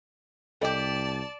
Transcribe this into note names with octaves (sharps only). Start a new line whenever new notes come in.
C2 G3 G4 A4 D5 D#5 A5